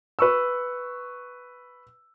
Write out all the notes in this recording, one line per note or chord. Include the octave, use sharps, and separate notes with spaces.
B4 C#6 E6